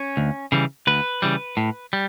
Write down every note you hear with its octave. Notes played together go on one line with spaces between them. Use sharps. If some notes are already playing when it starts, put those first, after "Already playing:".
Already playing: C#4
D2
C#3 E3 G3
D2 B4
C#3 E3 G3
A2
G3